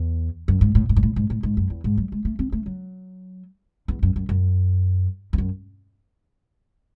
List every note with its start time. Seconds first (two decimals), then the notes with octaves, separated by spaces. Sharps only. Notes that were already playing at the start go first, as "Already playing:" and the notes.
Already playing: E2
0.48 F#2
0.61 G#2
0.75 A2
0.89 A2
0.96 G#2
1.03 A2
1.16 G#2
1.30 A2
1.43 G#2
1.57 F#2
1.70 E2
1.84 G#2
1.97 F#3
2.12 G#3
2.25 A3
2.39 C4
2.52 A3
2.66 F#3
3.88 E2
4.03 F#2
4.16 F#2
4.29 F#2
5.33 E2
5.38 F#2